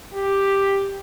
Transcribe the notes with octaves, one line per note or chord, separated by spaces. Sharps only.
G4